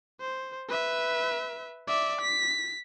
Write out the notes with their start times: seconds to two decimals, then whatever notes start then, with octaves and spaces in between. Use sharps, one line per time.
0.20 C5
0.68 B4 E5
1.87 D5 E5
2.21 B6